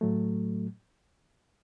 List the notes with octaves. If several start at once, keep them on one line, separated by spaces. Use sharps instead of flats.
A2 F#3 A3